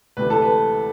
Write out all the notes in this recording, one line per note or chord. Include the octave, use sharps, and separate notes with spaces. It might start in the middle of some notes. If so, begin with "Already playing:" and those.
D2 C3 E3 B4
A4
B4